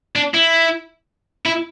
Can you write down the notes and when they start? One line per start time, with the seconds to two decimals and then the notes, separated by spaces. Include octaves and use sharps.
0.15 D4
0.34 E4
1.46 E4